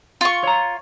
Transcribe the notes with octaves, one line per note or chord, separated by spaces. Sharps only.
F4 C#6
C#5 A#5